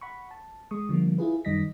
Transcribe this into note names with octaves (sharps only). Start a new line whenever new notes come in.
F#5 B5 C#6
A5
G#3 C#6 D#6
D3 F3 G3 A#3
E4 F4 G#4 B4
F#2 D#3 G3 D#5 A#6 B6